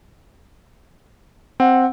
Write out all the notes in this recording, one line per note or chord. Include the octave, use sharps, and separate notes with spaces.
C4 F#5